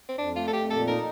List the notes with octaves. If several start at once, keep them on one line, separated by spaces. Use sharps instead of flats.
C4
F2 D4
A3 F4
A4
F2 G4
A#2 A4
D#4 A#4